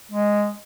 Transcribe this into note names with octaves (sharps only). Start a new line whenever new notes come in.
G#3